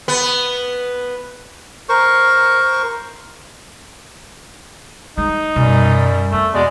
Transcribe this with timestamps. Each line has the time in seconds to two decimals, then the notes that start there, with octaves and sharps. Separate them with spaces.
0.08 B3
1.89 A#4 C5 C#6
5.18 G#3 D#4
5.56 F#2 B2 G3
6.32 F2 A3
6.54 E2 B2 G#3 D5